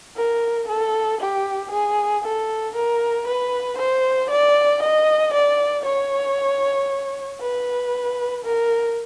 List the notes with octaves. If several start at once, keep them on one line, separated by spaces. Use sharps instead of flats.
A#4
A4
G4
G#4
A4
A#4
B4
C5
D5
D#5
D5
C#5
B4
A#4